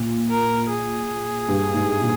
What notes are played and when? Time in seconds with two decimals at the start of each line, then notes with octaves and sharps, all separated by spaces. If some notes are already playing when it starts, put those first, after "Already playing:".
Already playing: A#2
0.30 A#4
0.69 G#4
1.48 G2
1.74 G#2
2.01 A#2